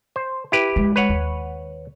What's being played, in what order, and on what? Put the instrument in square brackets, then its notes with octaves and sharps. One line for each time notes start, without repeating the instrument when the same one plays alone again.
[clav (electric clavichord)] C5
E4 G4 B4
[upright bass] G#3
[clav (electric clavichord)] B4 C#5 F#5
[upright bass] D#2